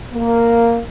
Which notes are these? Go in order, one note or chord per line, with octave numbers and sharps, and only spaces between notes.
A#3